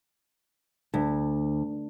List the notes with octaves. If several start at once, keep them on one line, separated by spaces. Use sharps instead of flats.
D2